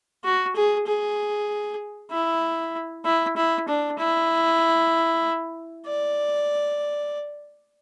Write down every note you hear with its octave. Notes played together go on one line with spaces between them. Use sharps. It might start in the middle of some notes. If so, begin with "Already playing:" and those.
F#4
G#4
G#4
E4
E4
E4
D4
E4
D5